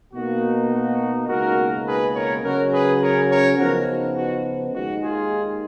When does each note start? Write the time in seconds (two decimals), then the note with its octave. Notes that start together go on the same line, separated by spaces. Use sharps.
0.13 B2 A#3 D#4 F#4
0.71 F#4
1.28 C#2 B2 A#3 D#4 F#4 A#4
1.85 G#4 B4
2.14 A#4 C#5
2.43 C#3 F#3 C#4 F#4 A#4
2.72 G#4 B4
3.01 A#4 C#5
3.30 A#4 C#5
3.58 C#3 F3 B3 D#4 F#4 A#4
3.87 F#4
4.16 F#4
4.73 D#2 D#3 G#3 D#4 F#4
5.02 F4 G#4